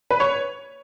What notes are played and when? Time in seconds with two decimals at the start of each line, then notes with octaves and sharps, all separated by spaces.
0.11 B4
0.20 C#5